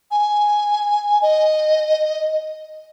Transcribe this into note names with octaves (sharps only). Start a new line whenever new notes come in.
G#5
D#5